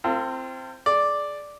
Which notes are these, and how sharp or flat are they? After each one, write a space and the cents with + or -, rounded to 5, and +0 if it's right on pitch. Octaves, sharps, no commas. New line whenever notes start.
C4 +0 F4 -35 A4 +45
G#4 +30 D5 +0